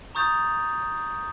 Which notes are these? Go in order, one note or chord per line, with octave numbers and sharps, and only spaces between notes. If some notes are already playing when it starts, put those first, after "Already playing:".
A#5 C#6 D#6 G6 A6 F7